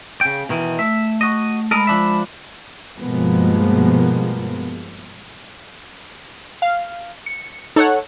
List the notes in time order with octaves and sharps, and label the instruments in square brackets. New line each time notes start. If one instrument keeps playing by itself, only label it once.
[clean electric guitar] C#3 G5
B2 D#3 E3
[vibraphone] A3 [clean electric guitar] E5
[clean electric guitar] F#4 D#5
[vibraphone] G#3 B5 [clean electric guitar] A4 A#4 D#5
[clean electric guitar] F3 D4 E5
[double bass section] G2 B2 F3 G#3 A#3 B3
[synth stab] F5
C#7
[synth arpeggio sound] D#4 [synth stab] A4 C#5 F#5